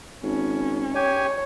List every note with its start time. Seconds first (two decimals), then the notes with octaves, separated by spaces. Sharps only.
0.23 G#1 C#4
0.95 G4 C#5 G#5